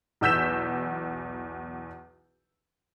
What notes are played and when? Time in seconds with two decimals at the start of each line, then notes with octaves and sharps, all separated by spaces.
0.21 B1 E2 E6 G6 B6 E7